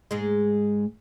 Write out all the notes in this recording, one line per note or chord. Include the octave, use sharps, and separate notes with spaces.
G#2 G#3